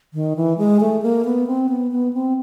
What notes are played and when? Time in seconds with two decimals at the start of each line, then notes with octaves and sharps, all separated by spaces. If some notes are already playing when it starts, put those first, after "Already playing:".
0.14 D#3
0.36 E3
0.58 G#3
0.81 A3
1.02 A#3
1.25 B3
1.47 C4
1.69 B3
1.91 B3
2.13 C4